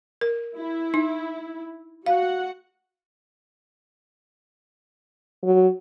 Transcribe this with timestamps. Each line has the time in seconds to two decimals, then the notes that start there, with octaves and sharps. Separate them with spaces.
0.21 A#4
0.56 E4
0.94 D#4
2.06 F#4 F5 F#5
5.44 F#3